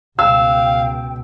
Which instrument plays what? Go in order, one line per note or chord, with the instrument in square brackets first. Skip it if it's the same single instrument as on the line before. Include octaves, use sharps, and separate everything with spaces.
[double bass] C#2 B2 [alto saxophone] F5 [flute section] G5 [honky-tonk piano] E6